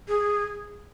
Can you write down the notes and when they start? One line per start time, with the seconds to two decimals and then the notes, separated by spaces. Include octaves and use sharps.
0.08 G#4